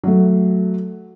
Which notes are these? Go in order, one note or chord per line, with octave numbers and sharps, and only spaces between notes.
F#3 A3